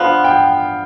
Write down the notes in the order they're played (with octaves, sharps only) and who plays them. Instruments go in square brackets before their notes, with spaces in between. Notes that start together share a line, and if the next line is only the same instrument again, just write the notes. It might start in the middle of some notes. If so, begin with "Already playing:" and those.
Already playing: [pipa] D3 F3 B3 [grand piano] F5
[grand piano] G5